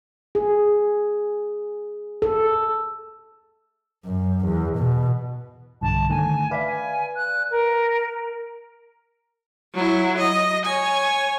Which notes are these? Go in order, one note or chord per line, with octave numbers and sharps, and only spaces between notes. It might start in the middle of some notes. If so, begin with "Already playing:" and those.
G#4
A4
F#2
E2
B2
B1 G2 D3 A5
D3 D#3 A3 G#5
B4 D5 E5 F5
G#5
F#6
A#4
F#3 E4
D#5
C#5 G#5